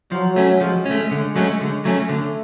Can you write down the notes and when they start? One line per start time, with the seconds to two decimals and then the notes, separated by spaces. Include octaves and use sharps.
0.12 F3 F#3
0.36 A3 C#4
0.61 F3 G#3
0.86 C#4
0.91 A3
1.11 D3
1.36 F#3 A3 C#4
1.61 D3
1.85 F#3 A3 C#4
2.09 D3 A3